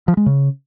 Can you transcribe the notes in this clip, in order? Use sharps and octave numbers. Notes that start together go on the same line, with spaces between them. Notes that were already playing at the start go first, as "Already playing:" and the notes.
F3
G#3
C#3